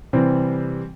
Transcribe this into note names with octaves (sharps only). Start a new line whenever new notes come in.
C3 E3 G3 C4